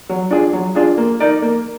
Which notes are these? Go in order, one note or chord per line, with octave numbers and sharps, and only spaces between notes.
F#3
D4 F4 G#4
F#3
D4 F4 G#4
A#3
D#4 A#4 D5
A#3